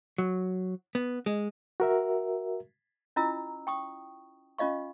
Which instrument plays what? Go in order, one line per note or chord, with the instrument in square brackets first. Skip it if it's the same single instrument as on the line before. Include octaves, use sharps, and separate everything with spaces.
[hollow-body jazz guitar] F#3
B3
G#3
[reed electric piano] F#4 A#4 E5
[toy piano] C#4 E4 F4 D#5 A#5 E6
G5 C#6 D#6
C#4 F4 D#5 F5 C#6